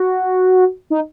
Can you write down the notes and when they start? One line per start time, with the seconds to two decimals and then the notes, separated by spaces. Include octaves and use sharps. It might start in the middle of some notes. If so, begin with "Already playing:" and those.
Already playing: F#4
0.90 D#4